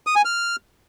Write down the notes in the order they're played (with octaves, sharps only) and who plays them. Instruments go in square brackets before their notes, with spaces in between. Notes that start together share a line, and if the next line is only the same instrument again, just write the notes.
[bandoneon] D#6
G#5
F6